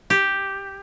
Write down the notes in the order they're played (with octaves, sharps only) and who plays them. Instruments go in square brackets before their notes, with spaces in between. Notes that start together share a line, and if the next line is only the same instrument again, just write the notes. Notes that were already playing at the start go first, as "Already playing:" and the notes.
[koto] G4